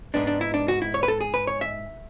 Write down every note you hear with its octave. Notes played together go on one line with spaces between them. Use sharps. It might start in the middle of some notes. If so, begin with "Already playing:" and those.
G#2 G#3 B3 D4
D4
E4
D4
F#4
E4
C#5
B4
A4
G#4
B4
C#5
E5